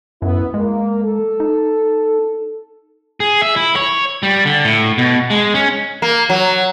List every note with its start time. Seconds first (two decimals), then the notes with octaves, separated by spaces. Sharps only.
0.22 F#2 B3 E4
0.54 G#3 A#3
1.03 A4
1.40 D#4
3.20 G#4
3.42 E5
3.56 E4
3.76 C#5
4.23 G3
4.45 D3
4.64 A2
4.98 B2
5.30 G#3
5.54 C#4
6.02 A#3
6.30 F#3